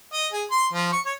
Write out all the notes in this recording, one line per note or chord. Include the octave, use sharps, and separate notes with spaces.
D#5
G#4
C6
F3
C#6
C#5